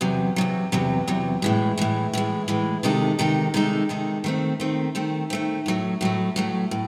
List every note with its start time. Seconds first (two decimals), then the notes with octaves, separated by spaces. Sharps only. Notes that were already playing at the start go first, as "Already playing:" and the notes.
0.01 E2 C3 F#3
0.36 E2 C3 F#3
0.72 E2 C3 F#3
1.08 E2 C3 F#3
1.42 A2 E3 G#3
1.78 A2 E3 G#3
2.13 A2 E3 G#3
2.48 A2 E3 G#3
2.83 C3 D#3 G#3 D#4 A4
3.19 C3 D#3 G#3 D#4 A4
3.54 C3 D#3 G#3 D#4 A4
3.89 C3 D#3 G#3 D#4 A4
4.24 D#3 A3 C4
4.60 D#3 A3 C4
4.95 D#3 A3 C4
5.30 D#3 A3 C4
5.66 A2 F#3 A3
6.01 A2 F#3 A3
6.36 A2 F#3 A3
6.71 A2